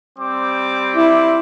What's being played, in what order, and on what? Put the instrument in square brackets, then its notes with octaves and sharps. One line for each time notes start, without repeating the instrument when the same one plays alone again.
[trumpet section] G3 C4 D6
[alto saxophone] E4